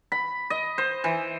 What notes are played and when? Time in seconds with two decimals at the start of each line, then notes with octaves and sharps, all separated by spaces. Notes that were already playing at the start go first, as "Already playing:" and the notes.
0.12 B5
0.50 D#5
0.78 C5
1.04 E3